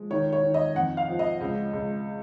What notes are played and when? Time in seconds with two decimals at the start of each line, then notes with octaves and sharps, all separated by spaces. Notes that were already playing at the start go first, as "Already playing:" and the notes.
Already playing: F3 G#3
0.10 D#3 C#5
0.33 C#5
0.43 D#3
0.54 D#5
0.75 F2 F#5
0.97 F5
1.08 F3
1.19 D#5
1.41 C#2
1.73 C#2